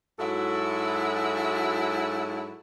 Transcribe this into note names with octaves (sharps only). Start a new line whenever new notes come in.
G#2 F#3 E4 F#4 A4